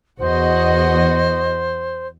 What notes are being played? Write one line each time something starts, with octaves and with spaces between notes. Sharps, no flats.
E2 F#4 C5 D#5